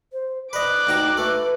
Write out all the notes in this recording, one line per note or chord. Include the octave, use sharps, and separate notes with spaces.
C5
B4 D5 D#5 D6 F#6
D2 D#4 G5 A#5
A3 B4